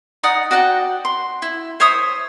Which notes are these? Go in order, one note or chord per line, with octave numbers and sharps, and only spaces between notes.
D#4 D5 F#5 D#6
F#4 D5 F#5 G5
C6
E4
C5 C#5 E5 D#6